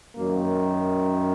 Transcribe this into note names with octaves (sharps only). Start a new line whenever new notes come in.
F#2 D#3 A#3